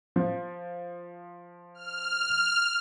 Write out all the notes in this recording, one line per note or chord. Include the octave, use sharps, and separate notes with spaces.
F3
F6